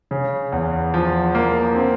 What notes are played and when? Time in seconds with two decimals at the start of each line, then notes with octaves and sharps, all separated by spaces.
0.11 C#3
0.52 E2
0.94 F3
1.35 A#3
1.75 C4